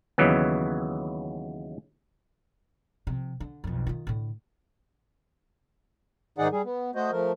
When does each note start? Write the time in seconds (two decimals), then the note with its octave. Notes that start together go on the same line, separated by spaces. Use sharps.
0.18 D#2 C#3 E3 F#3 B3
3.07 C3 F3
3.40 D3
3.64 B1 F2
3.87 D#3 F4
4.07 A2 D3
6.38 G#2 D#3 D#4 G#4 D5 F#5
6.52 G3 G#4
6.65 B3
6.95 A3 F#4 C5 D#5
7.12 F3 A3 A#4